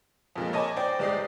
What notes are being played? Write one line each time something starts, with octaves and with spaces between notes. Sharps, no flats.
F2 A#2 G#3
C#5 D#5 G#5 A5 B5 D6
C5 D5 D#5 G5
G1 G#3 G4 D5 D#6 C7